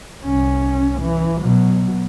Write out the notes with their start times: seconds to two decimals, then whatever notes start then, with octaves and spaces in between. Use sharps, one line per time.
0.24 C2 C#4
1.00 E3
1.41 B2 F#3